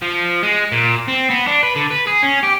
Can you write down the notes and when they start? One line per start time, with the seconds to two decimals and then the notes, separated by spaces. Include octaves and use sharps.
0.02 F3
0.43 G#3
0.72 A#2
1.08 C4
1.30 B3
1.47 D4
1.63 B4
1.76 D3
1.91 B4
2.07 G#4
2.23 C#4
2.43 G4